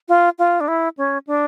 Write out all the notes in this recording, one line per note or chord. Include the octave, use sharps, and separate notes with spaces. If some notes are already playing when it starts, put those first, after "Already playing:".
F4
F4
D4
E4
C#4
D4